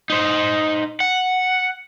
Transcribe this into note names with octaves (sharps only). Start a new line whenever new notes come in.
D#4 C5
F#5